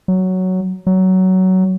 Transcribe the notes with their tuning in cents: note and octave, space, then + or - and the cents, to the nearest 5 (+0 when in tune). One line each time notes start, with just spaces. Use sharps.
F#3 +5
F#3 +15